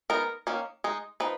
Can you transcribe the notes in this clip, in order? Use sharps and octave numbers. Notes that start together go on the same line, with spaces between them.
G#3 B3 D#4 A#4
D#3 A#3 C#4
G#3 D#4
F3 D#4 B4